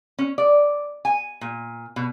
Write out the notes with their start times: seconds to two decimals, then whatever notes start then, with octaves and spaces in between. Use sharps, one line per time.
0.19 C#4
0.38 D5
1.05 G#5
1.41 A#2
1.96 B2